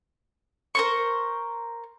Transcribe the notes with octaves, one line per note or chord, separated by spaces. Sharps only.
A#4 C5 C#6